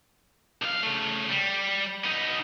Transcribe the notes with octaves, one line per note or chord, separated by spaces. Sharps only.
B1 F5
C#3 A3
G3
B3 D#4